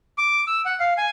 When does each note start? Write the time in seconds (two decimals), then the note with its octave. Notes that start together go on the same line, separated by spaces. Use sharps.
0.18 D6
0.47 E6
0.65 F#5
0.80 F5
0.98 G#5